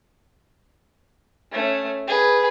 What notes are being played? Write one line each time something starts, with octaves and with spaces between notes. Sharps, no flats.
A3 C#4
G#4 B4